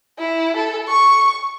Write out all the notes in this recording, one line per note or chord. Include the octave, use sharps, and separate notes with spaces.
E4
A4
C#6